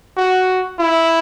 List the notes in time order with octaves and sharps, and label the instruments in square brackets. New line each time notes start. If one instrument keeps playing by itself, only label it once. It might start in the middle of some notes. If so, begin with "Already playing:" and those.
[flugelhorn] F#4
E4